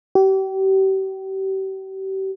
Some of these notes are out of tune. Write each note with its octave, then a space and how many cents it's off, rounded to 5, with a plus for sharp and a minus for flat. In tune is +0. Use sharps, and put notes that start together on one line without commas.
G4 -35